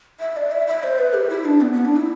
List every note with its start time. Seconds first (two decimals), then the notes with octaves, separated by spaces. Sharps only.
0.20 E5
0.37 D5
0.52 E5
0.67 E5
0.83 C5
0.98 B4
1.14 G4
1.30 E4
1.45 D4
1.61 B3
1.73 B3
1.85 D4
1.97 E4